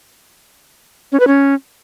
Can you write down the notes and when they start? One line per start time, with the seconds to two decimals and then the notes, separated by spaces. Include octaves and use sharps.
1.12 C#4
1.20 B4
1.27 C#4